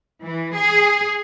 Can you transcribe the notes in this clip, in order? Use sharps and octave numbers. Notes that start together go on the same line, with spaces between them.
E3
G#4